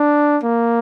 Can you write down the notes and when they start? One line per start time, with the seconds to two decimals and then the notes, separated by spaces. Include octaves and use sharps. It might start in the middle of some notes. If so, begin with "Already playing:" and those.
Already playing: D4
0.43 A#3